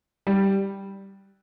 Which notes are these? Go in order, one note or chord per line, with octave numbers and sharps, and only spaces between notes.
G3